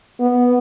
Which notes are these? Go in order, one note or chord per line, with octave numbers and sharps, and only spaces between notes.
B3